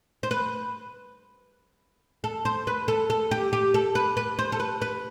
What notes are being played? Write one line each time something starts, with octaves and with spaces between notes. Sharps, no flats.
C5
B4
A4
C5
B4
A4
A4
G4
G4
A4
B4
B4
C5
A4
B4
B4